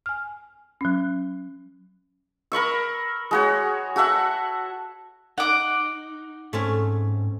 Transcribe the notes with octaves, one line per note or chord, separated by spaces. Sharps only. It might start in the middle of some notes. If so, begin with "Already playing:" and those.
G#5 F6
F#3 C#4
A#4 B5 C#6 E6
G#3 F#4 C#5
F#4 A4 E5 F#5
D#4 F#5 D6
G#2 A3 C4 C#4